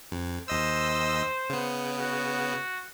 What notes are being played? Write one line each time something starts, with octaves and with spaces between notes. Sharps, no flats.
F2
D#2 C5 D#5 E6
C#3 B3
F#4